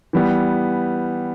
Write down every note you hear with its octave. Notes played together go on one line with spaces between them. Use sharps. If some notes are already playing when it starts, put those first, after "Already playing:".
E3 G3 B3